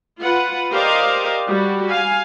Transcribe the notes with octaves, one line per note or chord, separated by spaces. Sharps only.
F4 B4 F#5
G4 A#4 C5 D5 D#5 F5
G3 F#4
F5 G#5